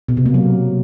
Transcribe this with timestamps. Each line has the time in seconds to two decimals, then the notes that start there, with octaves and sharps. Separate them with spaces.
0.09 B2
0.17 C3
0.26 A#3
0.34 F#3